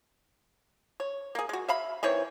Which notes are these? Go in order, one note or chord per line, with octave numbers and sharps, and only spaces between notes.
C#5
A#3 G#4
G#3 F#4
E5 F5 B5
D#3 E3 C4 C#5